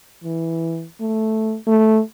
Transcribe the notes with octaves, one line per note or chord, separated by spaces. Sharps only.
E3
A3
A3